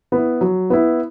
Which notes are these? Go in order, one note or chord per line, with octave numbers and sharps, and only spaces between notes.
B3 E4
F#3
B3 E4